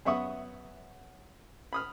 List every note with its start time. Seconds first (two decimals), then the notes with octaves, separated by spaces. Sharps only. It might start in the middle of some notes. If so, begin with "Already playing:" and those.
0.05 F#2 B3 E5 F#5 C#6 D#6
1.73 B5 D#6 F6